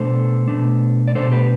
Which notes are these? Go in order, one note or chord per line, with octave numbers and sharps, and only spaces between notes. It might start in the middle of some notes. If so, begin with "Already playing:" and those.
Already playing: B2 A3 D4 A4 C5
B2 A3 D4
D5
B2 A3 D4 A4 C5
G4 B4